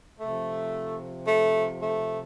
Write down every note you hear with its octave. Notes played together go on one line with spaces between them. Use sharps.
C3 F3 A3
A3
A3